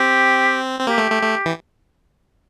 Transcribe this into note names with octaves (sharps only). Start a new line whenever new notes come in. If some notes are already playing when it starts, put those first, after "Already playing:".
Already playing: C4 G4
C4
A#3 G4
A3
A3
A3
E3